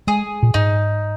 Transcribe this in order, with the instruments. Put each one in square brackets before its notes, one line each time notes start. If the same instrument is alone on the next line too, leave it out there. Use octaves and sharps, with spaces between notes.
[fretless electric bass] G#3 [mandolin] G#4
[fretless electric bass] A#2
[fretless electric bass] G#2 [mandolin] D#4